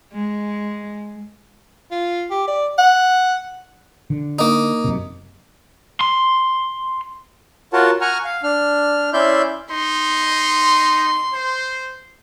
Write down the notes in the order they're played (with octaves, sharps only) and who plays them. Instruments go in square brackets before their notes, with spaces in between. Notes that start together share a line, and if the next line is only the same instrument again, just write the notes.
[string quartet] G#3
[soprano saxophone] F4
G4
D5
F#5
[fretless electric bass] D3
[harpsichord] A#3 D#4
[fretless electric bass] F#2 C3
[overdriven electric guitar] C6
[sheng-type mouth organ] F4 F#4 A#4 C#5 F#5 A5
F#5 G#5 A#5 C#6 F6
F5
D4 F6
C#4 E4 D5 E5 C6 G6
[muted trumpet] D#4 [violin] C6
[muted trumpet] C5